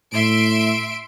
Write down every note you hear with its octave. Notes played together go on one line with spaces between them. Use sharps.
A2 E5 C6 D7